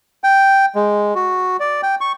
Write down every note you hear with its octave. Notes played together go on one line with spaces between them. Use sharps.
G5
G#3
F#4
D5
G5
C#6